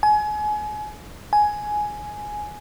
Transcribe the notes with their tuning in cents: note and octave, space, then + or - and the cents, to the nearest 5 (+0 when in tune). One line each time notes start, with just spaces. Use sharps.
G#5 +30
G#5 +10